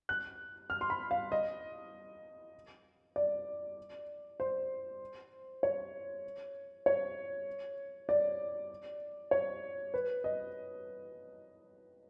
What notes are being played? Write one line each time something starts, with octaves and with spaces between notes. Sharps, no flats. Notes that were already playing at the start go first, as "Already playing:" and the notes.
F#6
F6
C6
B5
F5
D#5
D5
C5
C#5
C#5
D5
C#5
B4
D#5